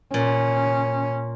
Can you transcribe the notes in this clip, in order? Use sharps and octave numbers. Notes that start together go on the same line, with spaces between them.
A#2 C#4